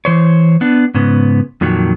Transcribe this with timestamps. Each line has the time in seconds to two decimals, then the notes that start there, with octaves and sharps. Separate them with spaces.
0.05 E3 C5 C#5
0.61 B3 D4
0.94 G#2 C#3 B3
1.61 F2 A#2 D#3 F#3